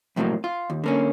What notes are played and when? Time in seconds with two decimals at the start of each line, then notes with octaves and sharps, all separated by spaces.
0.16 F2 A2 C3 E3 F#3 A#3
0.44 F4
0.70 D#2
0.84 D3 A#3 C#4